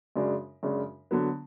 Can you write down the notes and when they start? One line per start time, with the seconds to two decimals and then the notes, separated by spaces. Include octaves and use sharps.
0.16 F#2 C#3 G#3 D4 F#4
0.63 F#2 C#3 G#3 D4 F#4
1.11 D3 F#3 B3